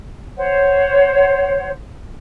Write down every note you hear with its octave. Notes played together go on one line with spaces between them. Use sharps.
C5 C#5 F#5